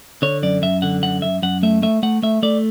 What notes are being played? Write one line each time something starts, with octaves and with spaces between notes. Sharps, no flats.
D3 C#5
F#2 D5
F#2 E5
D3 F#5
F#2 F#5
F#2 E5
F#2 F#5
A3 E5
A3 E5
A3 F#5
A3 E5
A3 D5